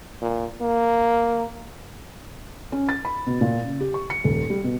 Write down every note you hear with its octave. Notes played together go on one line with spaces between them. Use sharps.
A#2
A#3
C#4
A6
B5
B2
A#2
C#3
G4
C#6
C#7
D#1
G3
B2